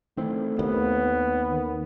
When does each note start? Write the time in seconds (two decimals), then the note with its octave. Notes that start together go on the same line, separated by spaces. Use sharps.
0.17 D#3 E3 A3 C4
0.59 D#2 B3
1.49 D#3